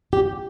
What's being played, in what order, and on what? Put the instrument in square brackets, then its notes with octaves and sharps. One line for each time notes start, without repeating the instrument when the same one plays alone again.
[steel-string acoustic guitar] G4